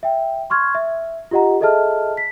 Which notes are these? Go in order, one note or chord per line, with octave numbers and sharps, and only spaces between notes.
E5 G5
C6 C#6 F6 G#6
E5
F4 G4 D#5 F#5 A#5
G#4 A4 D#5 E5 A5 F6
B6